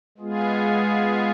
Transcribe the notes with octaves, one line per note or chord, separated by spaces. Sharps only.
G#3 B3 F4 G#4